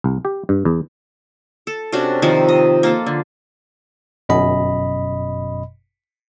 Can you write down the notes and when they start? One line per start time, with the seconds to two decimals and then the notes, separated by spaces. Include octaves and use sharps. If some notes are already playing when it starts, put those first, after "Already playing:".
0.04 C2
0.25 G4
0.49 G2
0.65 E2
1.67 A4
1.92 C3 C#4 D4 F#4
2.22 C3 D#3 F3
2.48 D#5
2.83 A#3 F4 A4
3.06 D3
4.29 G1 F#2 B2 D#5 B5